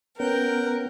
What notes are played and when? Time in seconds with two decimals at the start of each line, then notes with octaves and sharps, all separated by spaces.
0.20 B3 C#4 A#4 F#5 G5